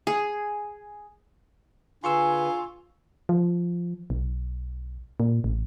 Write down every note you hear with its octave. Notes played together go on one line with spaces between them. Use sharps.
G#4
D3 F4 G#4 B4 G#5 C6 C#6 E6
F3
B1
A#2
A1